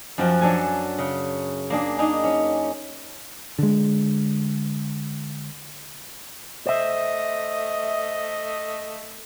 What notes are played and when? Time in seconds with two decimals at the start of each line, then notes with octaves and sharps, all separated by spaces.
0.18 F#2 F3 F#4 G5
0.41 F#3 D4 A4 G#5
0.98 C#3
1.70 A#3 D4 G#4
1.99 D4 D#4 G#4 D#5
2.24 C#4
3.59 D3 G#3
6.67 A3 C5 D#5 E5